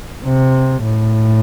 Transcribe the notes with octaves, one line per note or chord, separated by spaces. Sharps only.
C3
A2